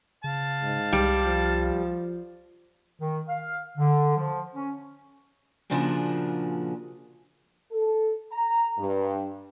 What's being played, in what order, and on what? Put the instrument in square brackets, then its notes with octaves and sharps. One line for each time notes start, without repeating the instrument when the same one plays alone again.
[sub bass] C#3 [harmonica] F5 A5
[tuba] G#2
[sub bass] C2 [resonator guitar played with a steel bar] G3
[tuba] F3
[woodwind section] D#3
F5
D3
F3
C#4
[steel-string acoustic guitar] A#2 C#3 F3 D4 F#4 G#4
[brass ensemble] A4
A#5
G2